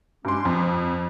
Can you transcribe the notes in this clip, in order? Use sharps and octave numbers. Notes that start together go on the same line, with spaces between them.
G2 G#3 C#4 C6 D6
F2 F3